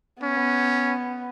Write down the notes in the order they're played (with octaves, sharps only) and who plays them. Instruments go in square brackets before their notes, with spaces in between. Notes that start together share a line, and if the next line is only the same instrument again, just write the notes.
[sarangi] B3 [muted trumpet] C#4